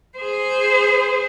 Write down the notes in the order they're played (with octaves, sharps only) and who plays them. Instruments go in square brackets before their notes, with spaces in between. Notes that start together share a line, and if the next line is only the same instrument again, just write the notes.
[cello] G#4 C5